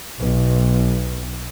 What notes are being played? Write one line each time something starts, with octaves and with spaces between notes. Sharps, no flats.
B1